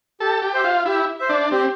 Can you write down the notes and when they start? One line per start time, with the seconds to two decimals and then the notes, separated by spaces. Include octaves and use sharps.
0.20 G4 A4
0.42 G4
0.54 C5 E5
0.64 F4
0.85 E4 G4
1.19 C5 E5
1.29 D4
1.52 C4 G4